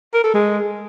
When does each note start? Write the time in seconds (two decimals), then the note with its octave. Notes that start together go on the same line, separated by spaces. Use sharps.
0.14 A#4
0.24 A4
0.34 G#3